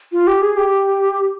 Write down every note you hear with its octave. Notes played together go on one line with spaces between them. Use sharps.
F4
G4
G#4
G4